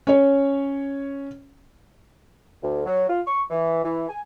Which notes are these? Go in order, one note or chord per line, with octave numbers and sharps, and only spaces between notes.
C#4 C#5
D2
F#3
F4
C#6
E3
E3
G#5